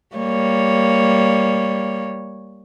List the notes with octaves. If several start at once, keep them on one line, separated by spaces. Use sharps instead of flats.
G3 A#3 C#5